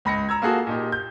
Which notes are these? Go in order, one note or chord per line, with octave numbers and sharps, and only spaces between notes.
C#2 B5 A#6 C#7
A#5 E6 G#6
A#3 F4 F#4 G#4 A4
A#2 D#4 G4
G6